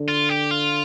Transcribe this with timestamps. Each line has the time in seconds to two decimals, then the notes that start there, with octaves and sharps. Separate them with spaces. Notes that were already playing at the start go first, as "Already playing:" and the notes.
Already playing: D3
0.08 F4
0.29 G4
0.51 F4